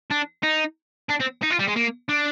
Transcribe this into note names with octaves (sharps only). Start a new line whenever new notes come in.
D4
D#4
D4
C4
D#4
F4
G3
G#3
A#3
D4